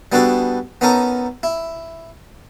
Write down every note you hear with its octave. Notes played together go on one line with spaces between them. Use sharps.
G3 B3 D4 F#4 G#4 A4
B3 C#4 D#4 A4 A#4 A#5
E4